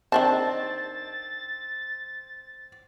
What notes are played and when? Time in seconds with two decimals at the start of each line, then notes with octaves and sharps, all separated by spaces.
0.12 D#3 C4 D4 A5 A6